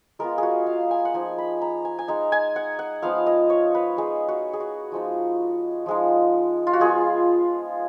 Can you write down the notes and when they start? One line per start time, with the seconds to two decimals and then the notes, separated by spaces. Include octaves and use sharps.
0.19 G#3 B3 F4 A#4
0.38 G#4
0.43 F#4
0.67 F5
0.91 G#5
1.05 F#5
1.14 F3 A#3 D#4 G#5
1.38 B5
1.62 A#5
1.85 G#5
1.99 G#5
2.08 G#3 D#4 A#5
2.32 G#5
2.56 F#5
2.79 F#5
3.02 F3 B3 D#4 F5
3.27 D#5
3.50 C#5
3.75 B4
3.97 G#3 D#4 G#4
4.28 F#4
4.53 G#4
4.60 F#4
4.92 F3 G#3 B3 D#4
5.86 F3 G#3 D#4
6.67 F4
6.73 F#4
6.80 F3 G#3 B3 F4 G#4